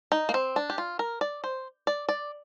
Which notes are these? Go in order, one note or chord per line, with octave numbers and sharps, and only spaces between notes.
D#4
A#3
C4
D4
G4
F4
A#4
D5
C5
D5
D5